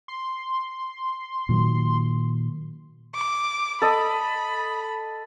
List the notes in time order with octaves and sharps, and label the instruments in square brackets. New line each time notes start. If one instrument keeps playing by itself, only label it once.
[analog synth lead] C6
[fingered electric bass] A#2 D#3 F#3
[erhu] D6
[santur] A4 D#5 [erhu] B5